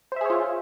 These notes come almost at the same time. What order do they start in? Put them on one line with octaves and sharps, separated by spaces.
C5 E5 G#4 C#5 F4